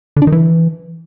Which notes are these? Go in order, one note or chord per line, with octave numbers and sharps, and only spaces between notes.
D3
D4
D#3
E3